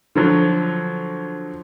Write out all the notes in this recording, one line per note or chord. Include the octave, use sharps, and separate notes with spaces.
D3 F3 F#3